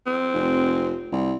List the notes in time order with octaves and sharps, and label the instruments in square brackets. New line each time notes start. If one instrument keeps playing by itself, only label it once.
[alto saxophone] C4
[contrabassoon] F1
C2